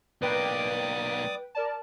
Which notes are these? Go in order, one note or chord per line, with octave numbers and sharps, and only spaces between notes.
B1 A#3 B4 D5 G5 D6 D#6
A#4 D5 A5